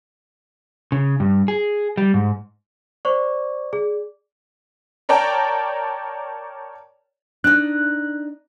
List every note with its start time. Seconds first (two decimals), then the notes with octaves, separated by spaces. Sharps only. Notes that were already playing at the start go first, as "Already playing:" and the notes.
0.92 C#3
1.20 G2
1.48 G#4
1.97 G3
2.14 G#2
3.05 C5 D5 C#6
3.73 G#4
5.09 A#4 C#5 D5 G5 A5 A#5
7.44 D4 D#4 F#6